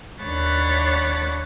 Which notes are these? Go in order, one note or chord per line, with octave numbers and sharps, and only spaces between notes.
D#2 D4 C#5 F#5 B5 A6